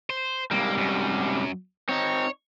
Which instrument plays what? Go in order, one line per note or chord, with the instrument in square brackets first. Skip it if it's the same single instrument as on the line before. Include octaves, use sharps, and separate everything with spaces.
[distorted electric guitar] C5
[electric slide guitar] G#2 C3 G3 [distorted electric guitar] A#3
[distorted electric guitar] F#2
[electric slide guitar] C4 D#4 [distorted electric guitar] C#5